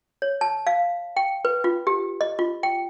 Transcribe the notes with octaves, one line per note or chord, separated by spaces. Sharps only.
C#5
A5
F5
G5
B4
F4
G4
D#5
F4
G5